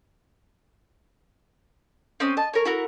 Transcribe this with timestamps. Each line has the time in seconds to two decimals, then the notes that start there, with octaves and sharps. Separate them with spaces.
2.20 C4 C#4 D#5 D#6
2.37 D#5 A5
2.53 A#4 C#5
2.65 E4 F#4 A#4